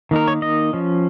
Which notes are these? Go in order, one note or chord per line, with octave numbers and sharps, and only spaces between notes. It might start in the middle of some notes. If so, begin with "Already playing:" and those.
D#3 A#3 D#4 A#4
C#5
D#5
F3 C#4